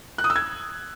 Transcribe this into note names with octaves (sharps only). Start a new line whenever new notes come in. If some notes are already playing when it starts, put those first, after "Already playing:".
F#6
D#6
E6
G#6